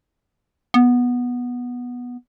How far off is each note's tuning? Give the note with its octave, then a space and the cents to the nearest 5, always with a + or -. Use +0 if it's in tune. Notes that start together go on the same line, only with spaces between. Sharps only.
B3 -10